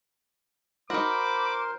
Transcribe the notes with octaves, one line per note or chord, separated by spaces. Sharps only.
D#4 F#4 A#4 C5 B5 D6